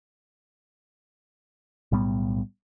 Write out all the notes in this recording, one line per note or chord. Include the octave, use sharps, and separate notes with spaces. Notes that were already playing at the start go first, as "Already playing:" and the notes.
B1 A2 G3 B3